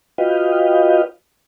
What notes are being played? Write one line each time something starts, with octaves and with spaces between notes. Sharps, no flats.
F4 F#4 B4 D#5 F5 G5